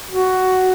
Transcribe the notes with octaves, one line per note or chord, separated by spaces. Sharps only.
F#4